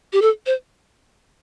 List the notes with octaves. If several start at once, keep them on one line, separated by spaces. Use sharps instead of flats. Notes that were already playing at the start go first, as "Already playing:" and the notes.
G4
A4
C5